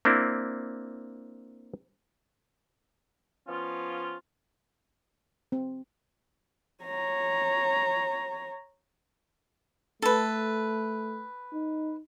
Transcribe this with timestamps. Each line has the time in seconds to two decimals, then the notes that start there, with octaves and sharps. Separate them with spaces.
0.05 A#3 C4 D4 E4
3.48 F3 B3 C#4 F4
5.52 C4
6.84 C#5 A#5
10.02 A3 A4 B4
11.53 D#4